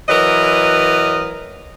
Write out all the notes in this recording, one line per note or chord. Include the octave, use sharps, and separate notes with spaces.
E3 F#3 A#4 B4 D#5